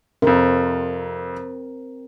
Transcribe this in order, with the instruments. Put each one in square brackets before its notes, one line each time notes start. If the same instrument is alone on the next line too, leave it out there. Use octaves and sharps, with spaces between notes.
[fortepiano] F2 C3 [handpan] C4 A#4